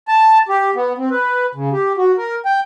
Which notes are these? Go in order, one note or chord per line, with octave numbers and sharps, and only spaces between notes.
A5
G4
B3
C4
B4
C#3
G4
F#4
A#4
G5